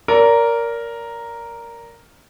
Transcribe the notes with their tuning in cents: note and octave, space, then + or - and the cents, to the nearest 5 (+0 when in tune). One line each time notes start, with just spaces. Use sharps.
A#4 +0 D5 -30